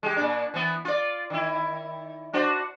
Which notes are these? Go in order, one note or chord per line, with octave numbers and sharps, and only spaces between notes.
G#3 G4
A#2 D4
E3 B3
F4 D5
D#3 E4
D4 F#4 C5